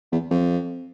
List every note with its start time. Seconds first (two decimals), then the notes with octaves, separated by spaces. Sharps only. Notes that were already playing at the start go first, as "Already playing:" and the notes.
0.12 E2
0.31 F2